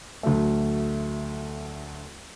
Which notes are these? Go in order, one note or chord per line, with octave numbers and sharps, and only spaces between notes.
D2 F#3 A3